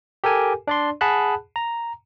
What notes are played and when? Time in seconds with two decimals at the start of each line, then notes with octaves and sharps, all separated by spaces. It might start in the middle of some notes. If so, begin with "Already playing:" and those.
0.24 G4 A4 A#4 G#5
0.67 D4 D5 C6
1.01 G#4 F#5 A5 B5 F#6
1.56 A#5